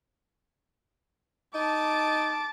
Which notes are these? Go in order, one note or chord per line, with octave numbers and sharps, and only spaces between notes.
D#4 A5 D6